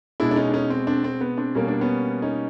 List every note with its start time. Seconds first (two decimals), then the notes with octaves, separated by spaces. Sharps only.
0.20 B2 G#3 D4 E4
0.31 D4
0.36 C#4 D#4
0.49 D4
0.53 C#4 D#4
0.70 C4
0.87 C4 D4
1.04 C4
1.21 B3
1.37 C4 D4
1.55 B2 G3 A#3 C#4
1.68 D4
1.81 B3 C#4
2.22 C#4 D#4